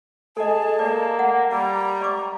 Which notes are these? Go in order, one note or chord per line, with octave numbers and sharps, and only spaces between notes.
G#4 A4 D#5 A5
A#3 D5
F#5
G3 A#5
D5 C#6 D6